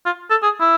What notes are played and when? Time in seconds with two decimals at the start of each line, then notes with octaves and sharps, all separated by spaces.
0.06 F4
0.30 A4
0.43 G#4
0.61 E4